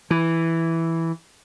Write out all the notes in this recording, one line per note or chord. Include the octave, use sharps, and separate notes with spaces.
E3